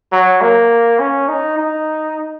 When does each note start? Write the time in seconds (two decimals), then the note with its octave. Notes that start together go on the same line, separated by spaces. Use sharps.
0.12 F#3
0.41 A#3
0.99 C#4
1.28 D#4
1.58 D#4